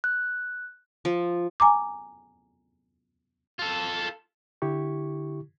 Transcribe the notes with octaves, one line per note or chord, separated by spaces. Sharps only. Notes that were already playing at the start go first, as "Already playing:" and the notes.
F#6
F3
G#5 A#5 D6
F4 A4
D3 E4 G4 C#6